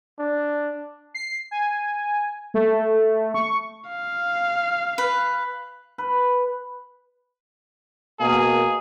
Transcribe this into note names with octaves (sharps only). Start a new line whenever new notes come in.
D4
C7
G#5
A3
C#6
F5
B4
B4
B2 A#3 G#4